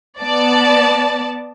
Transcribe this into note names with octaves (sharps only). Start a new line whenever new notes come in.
B3 D5 A5